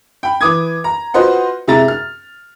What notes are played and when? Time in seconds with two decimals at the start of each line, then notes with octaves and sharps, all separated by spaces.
0.23 G5 B5
0.41 E3 B4 D6 D#6 G#6
0.84 A#5
1.14 F4 F#4 B4 C5 D#5 F#5
1.68 C3 G#3 E4 E5 A#5 A6
1.88 F6